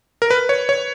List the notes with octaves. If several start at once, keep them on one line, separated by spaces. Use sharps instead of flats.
A#4
B4
C#5
C#5